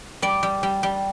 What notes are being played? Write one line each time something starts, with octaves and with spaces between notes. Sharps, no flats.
G3 D5
G3
G3
G3